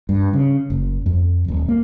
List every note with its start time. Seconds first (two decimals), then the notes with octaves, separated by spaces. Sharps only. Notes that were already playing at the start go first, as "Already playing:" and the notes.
0.09 G2
0.33 C#3
0.70 F#1
1.06 F2
1.48 D#1
1.69 A#3